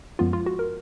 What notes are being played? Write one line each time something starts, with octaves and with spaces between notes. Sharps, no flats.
F#2 F3 G#3 B3 F4
F4
F#4
A#4